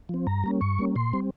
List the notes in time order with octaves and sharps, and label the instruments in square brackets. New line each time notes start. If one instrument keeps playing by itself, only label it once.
[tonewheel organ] F3 C4
G2 A#5
G3 A#3 C#4
G2 C#6
G3 A#3 C#4
A#2 C6
G3 C4